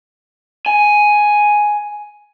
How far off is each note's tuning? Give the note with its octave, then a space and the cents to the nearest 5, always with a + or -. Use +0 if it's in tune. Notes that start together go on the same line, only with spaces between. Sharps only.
G#5 +5